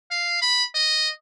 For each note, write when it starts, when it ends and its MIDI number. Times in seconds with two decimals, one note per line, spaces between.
0.11 0.42 77
0.42 0.64 83
0.75 1.09 75